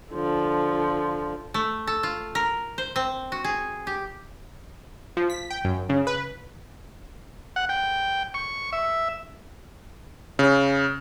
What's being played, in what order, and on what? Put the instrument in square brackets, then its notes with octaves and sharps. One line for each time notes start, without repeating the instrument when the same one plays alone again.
[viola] D3 F3
[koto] A3
A4
F4
A#4
C5
C4
F#4
G#4
G4
[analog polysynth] F3
B6
G5
F#2
C#3
B4
[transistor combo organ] F#5
G5
C#6
E5
[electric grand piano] C#3